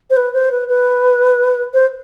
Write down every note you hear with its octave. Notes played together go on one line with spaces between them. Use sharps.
C5
B4
C5
B4
B4
C5